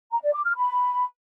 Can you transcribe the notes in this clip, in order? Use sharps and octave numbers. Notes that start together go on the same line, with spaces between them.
A#5
D5
D6
F6
B5